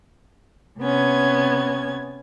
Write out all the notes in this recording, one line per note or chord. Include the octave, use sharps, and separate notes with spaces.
C3 B3 C#4 G#6